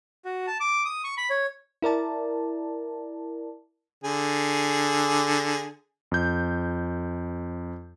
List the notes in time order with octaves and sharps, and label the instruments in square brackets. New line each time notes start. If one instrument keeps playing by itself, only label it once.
[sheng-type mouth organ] F#4
A5
D6
D#6
C#6
B5
C#5
[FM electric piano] E4 A#4 D5 A5
[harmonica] D3 G#4
[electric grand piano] F2 G6